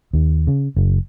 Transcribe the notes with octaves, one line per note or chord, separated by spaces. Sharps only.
D#2
C#3
F#1